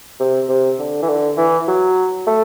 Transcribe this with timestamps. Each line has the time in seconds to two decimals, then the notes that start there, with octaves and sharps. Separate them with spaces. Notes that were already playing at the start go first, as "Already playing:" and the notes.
0.20 C3
0.49 C3
0.79 D3
1.02 E3
1.09 D3
1.38 E3
1.68 F#3
2.27 A3